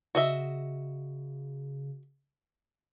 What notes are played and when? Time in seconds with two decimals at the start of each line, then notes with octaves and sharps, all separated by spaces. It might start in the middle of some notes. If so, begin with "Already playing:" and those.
0.15 C#3 F#4 D#5 E5